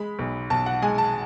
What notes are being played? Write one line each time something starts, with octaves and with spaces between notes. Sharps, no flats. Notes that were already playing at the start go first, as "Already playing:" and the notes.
Already playing: G#3 B5
B1
B1 A5
F#5
G#3 G#5
A5